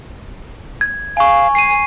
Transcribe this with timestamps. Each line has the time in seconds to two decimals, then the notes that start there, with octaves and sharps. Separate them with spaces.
0.81 G#6
1.17 F5 G#5 C#6
1.55 G#5 C7 D#7